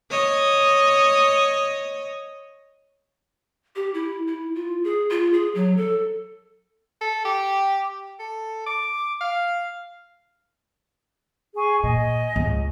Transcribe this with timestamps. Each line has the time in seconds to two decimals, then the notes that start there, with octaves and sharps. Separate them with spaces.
0.11 C#5 D#5
3.76 G4
3.94 E4
4.27 E4
4.55 F4
4.84 G#4
5.11 F4
5.33 G#4
5.55 F#3
5.77 A4
7.01 A4
7.25 G4
8.20 A4
8.67 D6
9.21 F5
11.55 G#4 G#5 C#6
11.84 A#2 D#5 G#5
12.36 C#2 G#2